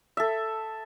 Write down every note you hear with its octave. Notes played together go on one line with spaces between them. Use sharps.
A4 E5